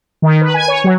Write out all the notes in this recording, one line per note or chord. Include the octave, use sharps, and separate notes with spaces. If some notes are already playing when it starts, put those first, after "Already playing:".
D#3
B4
G#5
C#5
F#3